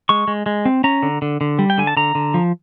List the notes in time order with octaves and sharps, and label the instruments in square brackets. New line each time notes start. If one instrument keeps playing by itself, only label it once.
[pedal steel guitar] G#3 C#6
G#3
G#3
C4
C#4 A#5
D3
D3
D3
G3
G5
D3 G#5
A5
D3 A#5
D3
F3